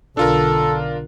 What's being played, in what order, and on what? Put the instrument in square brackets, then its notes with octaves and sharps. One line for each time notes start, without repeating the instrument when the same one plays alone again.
[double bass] B1 D3 [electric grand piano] D4 F4 A#4 [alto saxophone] A4